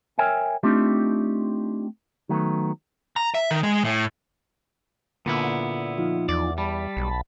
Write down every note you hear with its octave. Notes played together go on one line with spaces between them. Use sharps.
A#4 C#5 E5 G5 G#5
A3 C4 D4 D#4 F4 G4
D#3 F#3 A3 B3
A#5
E5
D#3
G#3
A2
A#2 D3 B3 E4
F3 D#4 F4
E2 D5
G3 A5 B5
B1